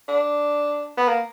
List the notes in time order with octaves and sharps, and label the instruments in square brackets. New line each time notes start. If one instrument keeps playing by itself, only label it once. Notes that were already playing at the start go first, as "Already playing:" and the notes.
[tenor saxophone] D4
B3
A#3